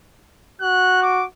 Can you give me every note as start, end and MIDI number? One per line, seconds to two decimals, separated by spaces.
0.61 1.25 66
0.61 0.99 90
1.03 1.24 86